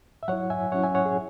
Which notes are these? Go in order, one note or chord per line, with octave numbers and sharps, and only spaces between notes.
E5
F#3 E4 C#5 F#5
E5 G#5
F#3 C#4 E4 C#5 F#5
E5 G#5
C#5 F#5
G#4